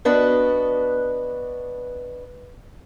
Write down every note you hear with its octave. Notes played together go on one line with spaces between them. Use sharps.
B3 D4 F#4 B4 D#5